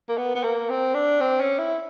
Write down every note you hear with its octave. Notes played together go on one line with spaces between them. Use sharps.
A#3
B3
B3
A#3
C4
D4
C4
C#4
E4